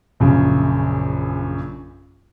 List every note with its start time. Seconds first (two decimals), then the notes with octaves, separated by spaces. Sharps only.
0.20 A#1 F#2 C#3